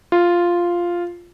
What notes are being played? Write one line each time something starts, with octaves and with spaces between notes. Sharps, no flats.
F4